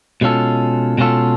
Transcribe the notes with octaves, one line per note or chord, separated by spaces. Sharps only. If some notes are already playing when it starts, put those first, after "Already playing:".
B2 G#3 C#4 F4 A4
B2 G#3 C#4 F4 A4